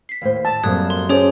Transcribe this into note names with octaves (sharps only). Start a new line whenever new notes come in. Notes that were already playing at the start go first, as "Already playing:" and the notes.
B6 C7
D#2 A2 C5
A5
F#2 A2 G3 A#3 C4 D#6 F#6 G#6
C6
C#4 G#4 C5 C#5 A5 D6 D#6